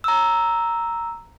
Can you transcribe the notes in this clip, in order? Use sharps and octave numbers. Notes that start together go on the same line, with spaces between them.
A#5 E6